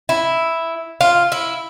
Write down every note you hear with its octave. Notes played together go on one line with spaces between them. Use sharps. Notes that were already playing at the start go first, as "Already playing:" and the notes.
E4
F4
E4